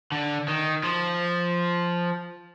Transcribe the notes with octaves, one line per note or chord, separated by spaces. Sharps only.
D3
D#3
F3